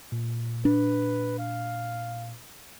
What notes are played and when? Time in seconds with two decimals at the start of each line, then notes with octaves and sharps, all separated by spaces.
0.12 A#2
0.65 D4 B4
1.38 F5